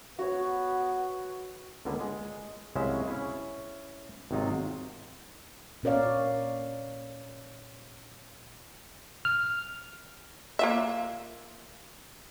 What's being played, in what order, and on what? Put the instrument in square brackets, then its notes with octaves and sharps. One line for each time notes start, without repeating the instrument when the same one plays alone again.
[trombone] B3 [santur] F#4 C#5
[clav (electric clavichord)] C#2 D3 A#3 B3
G#3
C2 C#3 F#3 G#3 C#4 E5
C#4 E4
G#1 C3 F#3 D#4 F4
[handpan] A#2 C#4 A#4 C#5 D5 F5
[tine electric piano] F6
[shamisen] A#3 F4 E5